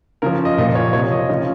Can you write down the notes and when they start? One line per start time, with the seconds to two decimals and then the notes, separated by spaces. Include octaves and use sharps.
0.22 C#3 F3 A#4
0.45 D#5
0.58 A#2 F3 D#5
0.75 C#5
0.93 C3 F3 C#5
1.12 D#5
1.29 C#3 F3